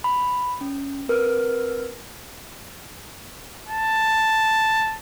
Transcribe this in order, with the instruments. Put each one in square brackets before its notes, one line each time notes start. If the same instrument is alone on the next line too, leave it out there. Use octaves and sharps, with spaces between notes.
[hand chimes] B5
C#4
C4 A#4 B4 F6
[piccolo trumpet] A5